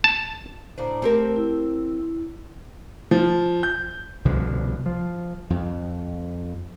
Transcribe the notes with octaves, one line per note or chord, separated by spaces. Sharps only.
A5
A2 C#3 D4 C5 A#5
A3 C4 G4 A#4
E4
F3
G6
C2 B2 D3 F3
F3
F2